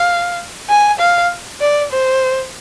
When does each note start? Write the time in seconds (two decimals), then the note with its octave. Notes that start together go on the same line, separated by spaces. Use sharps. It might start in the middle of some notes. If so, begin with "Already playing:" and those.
Already playing: F5
0.69 G#5
0.99 F5
1.60 D5
1.91 C5